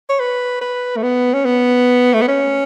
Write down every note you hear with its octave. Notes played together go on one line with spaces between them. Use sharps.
C#5
B4
B4
A3
B3
C#4
B3
A3
B3
C#4